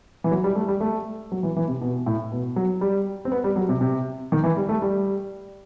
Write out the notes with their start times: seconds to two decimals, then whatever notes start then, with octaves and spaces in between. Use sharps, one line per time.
0.24 E3
0.31 F#3
0.44 G3
0.55 A3
0.68 G3
0.81 A3
1.32 F#3
1.43 E3
1.56 E3
1.68 C3
1.81 B2
2.06 A2
2.32 B2
2.56 F#3
2.81 G3
3.25 C4
3.32 B3
3.44 G3
3.56 F#3
3.69 C3
3.81 C3
4.32 D#3
4.44 E3
4.57 G3
4.69 A3
4.82 G3